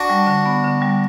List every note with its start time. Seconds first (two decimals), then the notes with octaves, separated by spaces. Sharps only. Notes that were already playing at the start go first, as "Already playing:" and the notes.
Already playing: D4 F#4
0.10 G3
0.27 D3
0.46 B3
0.64 D3
0.82 G3